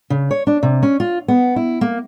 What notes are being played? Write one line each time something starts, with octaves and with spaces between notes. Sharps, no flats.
C#3
C#5
D4
C3
C#4
F4
B3
E4
A#3